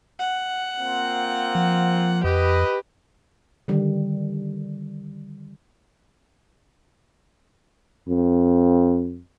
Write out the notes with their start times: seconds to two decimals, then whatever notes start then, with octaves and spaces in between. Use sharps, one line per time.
0.20 F#5
0.79 A#3 C4 F4
1.55 F3
2.24 F2 G4 B4 D#5
3.68 D3 D#3 G3
8.09 F2